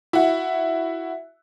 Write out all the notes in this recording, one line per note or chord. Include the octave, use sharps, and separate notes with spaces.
E4 F#4